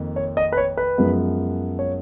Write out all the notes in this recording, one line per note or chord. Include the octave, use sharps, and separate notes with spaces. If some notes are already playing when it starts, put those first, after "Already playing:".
Already playing: F2 D#3 A#3
C#5
D#5
B4
C#5
B4
F#2 F3 G#3 B3
C#5